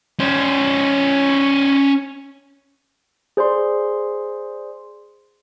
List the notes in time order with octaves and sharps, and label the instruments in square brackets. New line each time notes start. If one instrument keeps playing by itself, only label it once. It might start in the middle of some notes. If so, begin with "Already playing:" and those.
[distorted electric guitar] C#4 C5
[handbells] G#4 C5 D5 C6